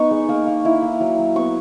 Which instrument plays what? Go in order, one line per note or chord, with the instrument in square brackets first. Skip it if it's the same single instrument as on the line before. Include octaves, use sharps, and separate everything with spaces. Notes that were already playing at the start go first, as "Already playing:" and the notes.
Already playing: [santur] B3 D#4 C#6
G#3
A#3
A#3
E4
A#3
F#3
F#3
B3 C#6